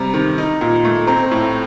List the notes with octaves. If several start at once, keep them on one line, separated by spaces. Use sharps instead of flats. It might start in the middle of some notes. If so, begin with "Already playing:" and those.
Already playing: C3 G3 A#5
D#3
D#4
A#2
A3
C4 A#5
A2